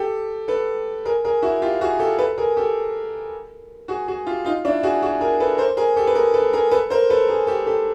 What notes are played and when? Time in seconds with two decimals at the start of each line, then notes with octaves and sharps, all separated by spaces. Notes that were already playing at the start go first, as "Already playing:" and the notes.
Already playing: G4 A4
0.48 A4 B4
1.05 G#4 A#4
1.25 G#4 A#4
1.42 E4 F#4
1.62 F4 G4
1.81 F#4 G#4
1.99 G4 A4
2.19 A4 B4
2.38 G#4 A#4
2.57 G4 A4
3.88 F#4 G#4
4.08 F#4 G#4
4.26 F4 G4
4.45 D#4 F4
4.65 D4 E4
4.83 F#4 G#4
5.02 F#4 G#4
5.21 G#4 A#4
5.40 A4 B4
5.58 A#4 C5
5.77 G#4 A#4
5.96 G4 A4
6.07 B4
6.15 G#4 A#4
6.34 A4 B4
6.53 G#4 A#4
6.71 A4 B4
6.90 A#4 C5
7.10 A4 B4
7.28 G#4 A#4
7.47 G4 A4
7.66 G4 A4